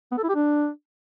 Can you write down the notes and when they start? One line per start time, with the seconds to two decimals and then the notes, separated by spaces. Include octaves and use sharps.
0.12 B3
0.18 A4
0.23 E4
0.29 G4
0.35 D4